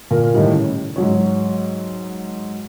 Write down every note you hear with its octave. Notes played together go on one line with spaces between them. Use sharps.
A#2 A#4
A2 D#3 G3
C#3
G#2 F#3 C#5